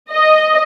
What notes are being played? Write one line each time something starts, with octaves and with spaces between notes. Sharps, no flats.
D#5